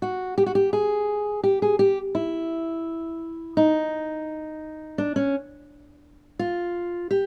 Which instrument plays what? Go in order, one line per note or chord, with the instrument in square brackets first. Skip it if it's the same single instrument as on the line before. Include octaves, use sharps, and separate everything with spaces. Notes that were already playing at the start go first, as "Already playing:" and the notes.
[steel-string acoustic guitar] F#4
G4
F#4
G4
G#4
G4
G#4
G4
E4
D#4
D4
C#4
F4
G4